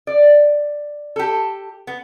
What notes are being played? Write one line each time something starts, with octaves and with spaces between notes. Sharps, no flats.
D5
G4 A4
B3